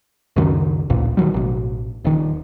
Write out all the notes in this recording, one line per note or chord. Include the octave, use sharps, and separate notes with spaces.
C#2 F#2 D#3
A1 D2 A#2
D#3 F#3 G3
A1 B2
D#1 D#3